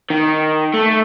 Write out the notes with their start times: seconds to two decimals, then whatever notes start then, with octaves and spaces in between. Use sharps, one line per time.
0.10 D#3
0.74 A3